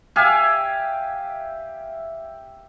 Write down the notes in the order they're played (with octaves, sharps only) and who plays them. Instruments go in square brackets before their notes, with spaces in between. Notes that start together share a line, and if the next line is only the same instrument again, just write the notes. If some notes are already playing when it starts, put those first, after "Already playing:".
[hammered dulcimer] G4 E5 F5 G#5